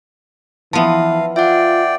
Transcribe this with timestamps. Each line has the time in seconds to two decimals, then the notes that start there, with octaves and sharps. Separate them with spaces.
0.73 E3 F3 B3 E5 F5 A5
1.36 F4 D5 E5 F#5 G5